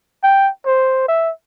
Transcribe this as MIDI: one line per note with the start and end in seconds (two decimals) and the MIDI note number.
0.24 0.49 79
0.66 1.04 72
1.08 1.31 76